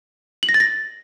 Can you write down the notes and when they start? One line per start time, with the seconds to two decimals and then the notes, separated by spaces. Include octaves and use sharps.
0.43 F#7
0.49 A#6
0.54 A6
0.60 A#6